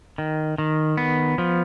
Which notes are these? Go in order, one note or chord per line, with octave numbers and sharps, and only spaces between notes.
D#3
D#3
B3
F3